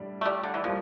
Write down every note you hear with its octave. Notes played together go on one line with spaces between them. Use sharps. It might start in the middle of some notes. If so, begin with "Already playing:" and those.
Already playing: A2 G3 D4
A3
G3
D3
E3
F3 G3 A#3